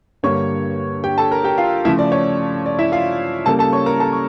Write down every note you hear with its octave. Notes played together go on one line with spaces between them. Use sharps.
G2 D3 G3 A#3 C#5 C#6
G4 G5
A4 A5
A#4 A#5
G4 G5
F4 F5
C#3 F3 A3 E4 E5
D5
C#5
D5
E4 E5
F4 F5
C#3 G3 A#3 A4 A5
A4 A5
C#5 C#6
A#4 A#5
A4 A5
C#6